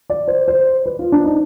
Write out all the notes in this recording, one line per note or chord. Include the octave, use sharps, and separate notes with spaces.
D5
C5
C5
B4
F4
D4
D#4